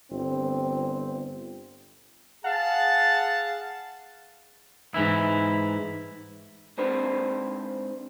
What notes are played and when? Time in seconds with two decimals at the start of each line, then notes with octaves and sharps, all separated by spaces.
0.11 G1 C4
2.44 G#4 F5 F#5 A5
4.94 G#2 E3 E4
6.78 G#2 C4 D4 G4 B4 C5